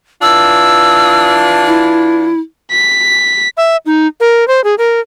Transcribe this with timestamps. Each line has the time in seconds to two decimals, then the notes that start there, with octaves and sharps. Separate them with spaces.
0.22 E3 D4 F4 E6
1.66 E4
2.72 B6
3.57 E5
3.86 D#4
4.20 A#4
4.48 C5
4.64 G#4
4.78 A#4